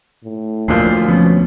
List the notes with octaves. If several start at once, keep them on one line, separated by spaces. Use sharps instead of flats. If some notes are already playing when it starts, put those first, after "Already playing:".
A2
D2 A#2 D3 F3 C7
B2 F3 C#4